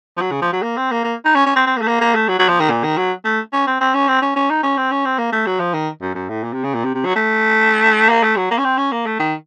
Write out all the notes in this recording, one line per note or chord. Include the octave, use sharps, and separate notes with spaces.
F3
F#3
C#3
F3
F#3
A#3
C4
A#3
A#3
D#4
C#4
C#4
C4
C4
A#3
A3
A#3
A#3
A3
F#3
F#3
F3
D#3
A#2
D#3
F#3
A3
C#4
C4
C4
C#4
C4
C#4
C#4
D#4
C#4
C4
C#4
C4
A#3
A3
F#3
F3
D#3
F#2
F#2
A2
A#2
C3
C#3
A#2
C3
C3
F#3
A3
A#3
A3
F#3
A#3
C#4
C4
C#4
A#3
A3
D#3